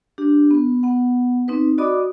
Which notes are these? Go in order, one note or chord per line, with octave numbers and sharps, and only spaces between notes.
D4 G4
B3
B3 F#5
C4 D#4 B4
F#4 D5 D#5 B5 D6 D#6